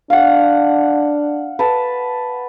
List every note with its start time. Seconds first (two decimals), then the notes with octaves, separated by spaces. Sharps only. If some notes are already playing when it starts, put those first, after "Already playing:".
0.10 D4 F5 F#5
1.59 B4 A5